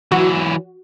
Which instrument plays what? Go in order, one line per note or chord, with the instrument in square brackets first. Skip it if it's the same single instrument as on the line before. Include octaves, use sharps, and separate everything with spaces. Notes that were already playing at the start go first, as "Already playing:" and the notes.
[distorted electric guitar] E3 F#3 [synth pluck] F#4